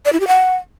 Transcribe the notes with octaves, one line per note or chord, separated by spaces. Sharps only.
D5
E4
G4
F#5